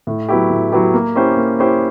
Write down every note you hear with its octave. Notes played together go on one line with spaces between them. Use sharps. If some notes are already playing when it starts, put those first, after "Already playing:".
A2
F#3 B3 E4 G4
A2
F#3 B3 E4 G4
A#3
C#4 E4 G4 C5
A#3
C#4 E4 G4 C5